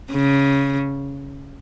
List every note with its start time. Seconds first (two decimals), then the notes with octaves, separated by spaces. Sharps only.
0.11 C#3